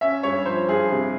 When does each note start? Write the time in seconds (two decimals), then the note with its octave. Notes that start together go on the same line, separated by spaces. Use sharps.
0.01 C#4 E5
0.23 G2 C#5
0.46 F3 C5
0.69 G2 G#4
0.91 C3